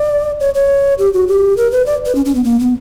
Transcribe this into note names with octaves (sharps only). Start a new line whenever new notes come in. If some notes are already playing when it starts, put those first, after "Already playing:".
Already playing: D5
C#5
C#5
G4
F#4
G4
A#4
B4
D5
B4
C#4
C#4
B3
A#3
B3